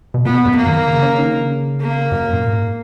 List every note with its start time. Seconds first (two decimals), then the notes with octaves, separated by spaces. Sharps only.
0.14 B2
0.25 A#2 B3
0.45 F#2
0.56 A#3
0.67 D#3
0.87 C#3
1.03 C#3
1.18 D#3
1.34 C#3
1.81 A#3
2.12 F#2
2.33 A#2
2.44 G#2